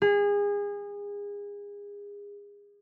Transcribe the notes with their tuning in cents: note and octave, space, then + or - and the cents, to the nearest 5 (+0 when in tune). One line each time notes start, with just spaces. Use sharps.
G#4 -30